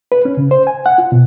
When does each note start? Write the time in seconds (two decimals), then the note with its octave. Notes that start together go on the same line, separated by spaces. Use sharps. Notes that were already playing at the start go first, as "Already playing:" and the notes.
0.12 B4
0.25 C#4
0.37 C#3
0.51 C5
0.67 G#5
0.86 F#5
0.98 F4
1.12 B2